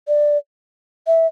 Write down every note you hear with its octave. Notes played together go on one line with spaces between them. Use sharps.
D5
E5